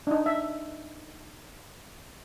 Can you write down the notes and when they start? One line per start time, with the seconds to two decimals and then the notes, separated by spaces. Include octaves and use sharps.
0.07 D4 D#4
0.26 E5